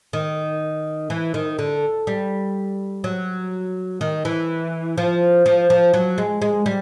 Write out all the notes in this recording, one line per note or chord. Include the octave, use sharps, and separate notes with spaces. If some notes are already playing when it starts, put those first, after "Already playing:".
D#3
E3
D#3
D3
G3
F#3
D#3
E3
F3
F3
F3
F#3
G#3
G#3
G3